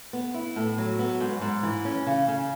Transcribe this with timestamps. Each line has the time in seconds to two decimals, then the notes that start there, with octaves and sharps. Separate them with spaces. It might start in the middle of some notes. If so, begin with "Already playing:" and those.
0.13 B3
0.34 E4
0.56 A2
0.78 F#3
0.99 B3
1.20 G#2
1.41 G#2
1.63 E3
1.85 C#4
2.06 C#3
2.28 C#3